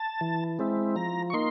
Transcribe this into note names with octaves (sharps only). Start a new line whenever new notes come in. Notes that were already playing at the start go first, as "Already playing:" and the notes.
Already playing: A5
E3
G#3 C4 E4
F3 A#5
C#6
A#3 D#4 C6